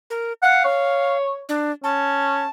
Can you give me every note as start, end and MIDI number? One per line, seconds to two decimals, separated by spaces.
0.10 0.33 70
0.43 1.17 77
0.43 0.61 78
0.65 1.42 73
1.49 1.71 62
1.84 2.45 61
1.84 2.50 81